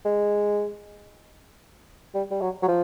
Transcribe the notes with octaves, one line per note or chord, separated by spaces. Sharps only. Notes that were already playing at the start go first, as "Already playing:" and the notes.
G#3
G3
G3
F#3
F#3
F3